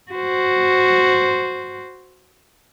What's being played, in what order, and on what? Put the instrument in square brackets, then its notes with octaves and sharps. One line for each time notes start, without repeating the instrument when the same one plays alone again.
[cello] F#4 C5